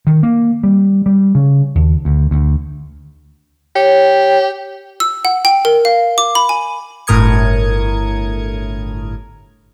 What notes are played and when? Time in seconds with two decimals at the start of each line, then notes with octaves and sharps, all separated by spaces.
0.07 D#3
0.23 A#3
0.64 G3
1.06 G3
1.35 C#3
1.75 D#2
2.05 D2
2.31 D2
3.76 G4 C#5
5.00 E6
5.25 F#5
5.45 G5
5.65 A#4
5.85 F5
6.18 D6
6.35 B5
6.49 G#5
7.07 G1 A2 A#4 D#6 G#6 C#7